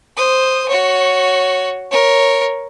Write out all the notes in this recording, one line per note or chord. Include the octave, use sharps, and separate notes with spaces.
C5 D#6
F#4 C#5
A#4 C#5